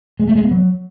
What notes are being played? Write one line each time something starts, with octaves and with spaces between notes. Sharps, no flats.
G#3
A3
G#3
B3
F#3